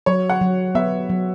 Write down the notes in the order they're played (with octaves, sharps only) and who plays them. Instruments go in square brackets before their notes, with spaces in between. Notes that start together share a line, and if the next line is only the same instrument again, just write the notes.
[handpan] F#3 [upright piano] C#5
[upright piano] F#5
[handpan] F#3
[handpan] B3 [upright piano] E5
[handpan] F#3